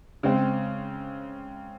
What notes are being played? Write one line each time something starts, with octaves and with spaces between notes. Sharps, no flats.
C#3 G#3 C4